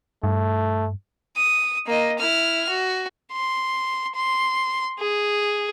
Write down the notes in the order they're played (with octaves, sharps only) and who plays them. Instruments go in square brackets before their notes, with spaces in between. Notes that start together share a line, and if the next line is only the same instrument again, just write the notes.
[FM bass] G2 [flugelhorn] A3
[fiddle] D#6
A#3 D#5
E4 F6
F#4
C6
C6
G#4